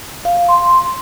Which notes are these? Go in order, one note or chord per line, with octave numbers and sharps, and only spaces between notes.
F5
F5
C6